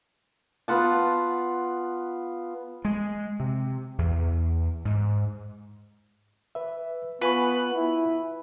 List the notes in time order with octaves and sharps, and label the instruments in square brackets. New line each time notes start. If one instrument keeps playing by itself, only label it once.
[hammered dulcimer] B3 F4 F#5 A5
[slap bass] G#3
C3
E2
G#2
[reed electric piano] B4 E5
[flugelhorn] B3 [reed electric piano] F4 G#5 C#6 [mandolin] B4
[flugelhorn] E4